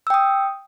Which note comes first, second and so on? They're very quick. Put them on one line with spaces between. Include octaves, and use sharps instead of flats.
E6 G5 D#6